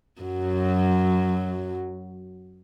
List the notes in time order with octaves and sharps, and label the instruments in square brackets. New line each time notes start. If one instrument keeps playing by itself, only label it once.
[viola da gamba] F#2 F#3